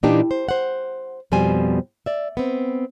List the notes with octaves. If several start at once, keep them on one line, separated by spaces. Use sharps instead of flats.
A#2 E3 A#3 D4 D#4 G4
C5
C5 F#5
F2 B2 F3 G3 C5 G#5
D5 E5
B3 C4